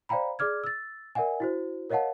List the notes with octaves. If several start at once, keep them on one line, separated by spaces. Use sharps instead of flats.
C5 D5 F5 G5 A#5 B5
G#4 D5 D6 F6 G#6
E6 A6
A#4 D5 E5 F#5 G#5
E4 F#4 C5
A#4 C#5 D#5 F5 F#5 A5